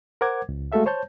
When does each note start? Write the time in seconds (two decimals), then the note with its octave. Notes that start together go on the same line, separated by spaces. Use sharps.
0.21 A#4 C5 F#5 D6 G#6
0.49 C#2
0.72 G#3 A3 F#4 A4 E5 F5
0.86 C5 C#5 A5 G6